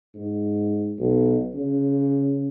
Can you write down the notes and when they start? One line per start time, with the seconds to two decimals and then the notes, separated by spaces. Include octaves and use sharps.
0.15 G#2
0.99 B1
1.55 C#3